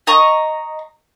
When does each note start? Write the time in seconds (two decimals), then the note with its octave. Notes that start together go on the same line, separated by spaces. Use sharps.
0.07 D#5 A#5 C#6